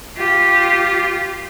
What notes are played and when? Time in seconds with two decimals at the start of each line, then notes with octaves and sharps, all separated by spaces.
0.17 F4 G4